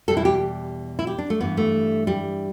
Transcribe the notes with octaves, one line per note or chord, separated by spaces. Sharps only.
E2 B2 G3 A4
E4
G4
E4
G4
D4
A3
G2 E3 G3 B3
A3
G3